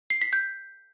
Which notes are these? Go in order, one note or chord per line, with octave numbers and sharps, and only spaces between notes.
C7
B6
G6